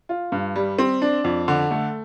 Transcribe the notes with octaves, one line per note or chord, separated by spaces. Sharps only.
F4
G2
G3
C4
D4
F2
D3
A3